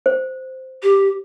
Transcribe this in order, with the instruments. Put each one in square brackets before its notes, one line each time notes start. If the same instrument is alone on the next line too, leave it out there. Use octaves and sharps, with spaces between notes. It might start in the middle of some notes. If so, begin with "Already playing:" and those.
[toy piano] C5
[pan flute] G4